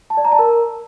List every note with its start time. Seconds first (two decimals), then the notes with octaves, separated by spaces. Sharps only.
0.10 A5
0.17 D5
0.25 A#5
0.32 A5
0.39 A#4